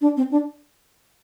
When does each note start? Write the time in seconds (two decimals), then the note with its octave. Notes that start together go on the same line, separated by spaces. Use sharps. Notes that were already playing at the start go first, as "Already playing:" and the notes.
0.01 D4
0.17 C4
0.31 D4